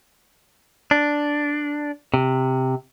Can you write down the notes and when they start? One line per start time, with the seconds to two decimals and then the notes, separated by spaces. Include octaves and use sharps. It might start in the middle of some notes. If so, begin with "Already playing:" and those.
0.91 D4
2.14 C3